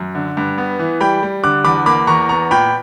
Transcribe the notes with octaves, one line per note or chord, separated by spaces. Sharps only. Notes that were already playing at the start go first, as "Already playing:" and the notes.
Already playing: F#2
D3
G2
B3
E3
G3 G5 B5
G3
D3 D6 F#6
E2 B5 D6
A#3 B5 D6
E2 A#5 C#6
B3 A#5 C#6
A#2 G5 B5